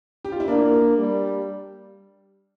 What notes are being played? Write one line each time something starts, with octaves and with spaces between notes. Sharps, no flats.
G4
F4
E4
A#3 D4
G3